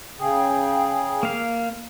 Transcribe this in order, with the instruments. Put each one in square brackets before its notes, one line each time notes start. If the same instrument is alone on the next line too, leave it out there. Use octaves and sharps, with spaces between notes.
[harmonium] C#3 G#4 [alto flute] G5
[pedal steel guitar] A#3 F5